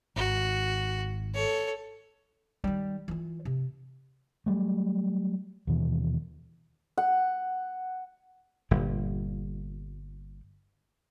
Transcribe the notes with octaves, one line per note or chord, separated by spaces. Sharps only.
G#1 F#4
A4 C#5
D#3 G3
E3 F4
C3
F#3 G3 A3
D#2 B2 E3
F#5
G1 A#2 G3